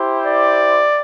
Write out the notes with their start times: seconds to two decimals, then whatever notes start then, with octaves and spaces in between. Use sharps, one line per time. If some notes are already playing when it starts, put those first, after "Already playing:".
Already playing: E4 G4 C5
0.26 D5